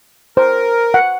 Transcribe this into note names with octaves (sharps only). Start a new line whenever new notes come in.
A#4 C5
F#5